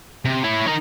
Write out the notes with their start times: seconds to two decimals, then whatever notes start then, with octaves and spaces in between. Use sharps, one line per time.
0.25 C3
0.44 E4 C#5
0.67 D#4 A#4